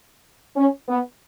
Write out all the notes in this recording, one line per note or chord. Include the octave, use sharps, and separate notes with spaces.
C#4
B3